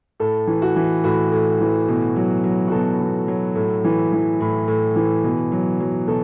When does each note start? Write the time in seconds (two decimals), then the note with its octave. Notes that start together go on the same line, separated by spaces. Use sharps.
0.20 A2 A4
0.47 E3
0.62 F#4
0.76 E3
1.04 A2 F#4
1.32 A2
1.60 E3
1.88 B2
2.16 F#3
2.44 F#3
2.68 F#4
2.72 B2 A4
3.00 B2
3.28 F#3
3.55 A2
3.84 E3
4.13 E3
4.40 A2
4.68 A2
4.96 E3
5.24 B2
5.52 F#3
5.80 F#3
6.08 B2 A4